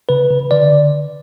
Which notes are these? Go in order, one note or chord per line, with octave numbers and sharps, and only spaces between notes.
C#3 B4
C#3
D3 D5